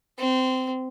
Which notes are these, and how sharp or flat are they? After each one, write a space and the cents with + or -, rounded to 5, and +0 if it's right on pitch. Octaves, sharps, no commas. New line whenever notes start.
C4 -20